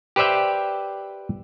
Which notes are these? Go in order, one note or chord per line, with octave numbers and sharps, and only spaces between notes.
G4 B4 C5 D5 E5 G5